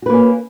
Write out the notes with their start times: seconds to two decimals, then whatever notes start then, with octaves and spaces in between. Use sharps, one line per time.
0.02 F#4
0.06 B4
0.10 A#3
0.13 C#4